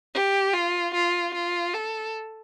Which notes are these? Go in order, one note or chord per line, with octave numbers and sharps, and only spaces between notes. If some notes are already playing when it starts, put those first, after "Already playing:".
G4
F4
F4
F4
A4